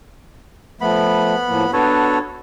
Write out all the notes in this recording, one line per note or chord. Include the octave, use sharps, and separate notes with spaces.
F3 A3 B3 B5
A2 F3 A#3
B3 D4 F#4 A4 B4 C#5